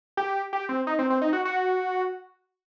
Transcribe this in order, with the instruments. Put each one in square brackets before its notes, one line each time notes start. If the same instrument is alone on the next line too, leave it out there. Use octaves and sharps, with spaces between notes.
[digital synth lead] G4
G4
C4
D#4
C4
C4
D#4
F#4
F#4